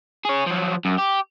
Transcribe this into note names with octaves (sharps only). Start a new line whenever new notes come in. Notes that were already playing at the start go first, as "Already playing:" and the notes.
G#4 C#5
F3 F#3
F#2
G4